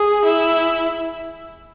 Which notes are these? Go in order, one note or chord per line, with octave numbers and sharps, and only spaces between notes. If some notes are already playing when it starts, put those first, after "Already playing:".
Already playing: G#4
E4